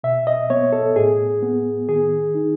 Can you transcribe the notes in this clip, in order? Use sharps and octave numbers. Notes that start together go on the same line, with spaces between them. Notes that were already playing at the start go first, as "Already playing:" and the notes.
B2 E5
D#5
B3 C#5
A4
A2 G#4
B3
D#3 G#4
D#4